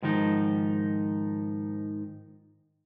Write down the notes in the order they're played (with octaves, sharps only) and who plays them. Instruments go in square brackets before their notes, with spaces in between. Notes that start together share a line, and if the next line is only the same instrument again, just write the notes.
[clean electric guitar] G#2 D#3 F3 D#4